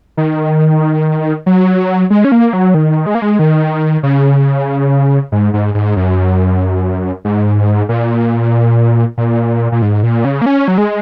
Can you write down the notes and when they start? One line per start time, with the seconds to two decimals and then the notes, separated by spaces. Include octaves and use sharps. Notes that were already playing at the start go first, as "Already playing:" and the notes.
0.17 D#3
1.46 F#3
2.10 G#3
2.25 C#4
2.32 A#3
2.53 F#3
2.74 D#3
3.06 G#3
3.15 A#3
3.22 G#3
3.39 D#3
4.03 C#3
5.32 G#2
5.53 G#2
5.74 G#2
5.96 F#2
7.25 G#2
7.89 A#2
9.17 A#2
9.72 A#2
9.82 G#2
10.03 A#2
10.25 C#3
10.42 A#3
10.46 C#4
10.68 F#3
10.78 G#3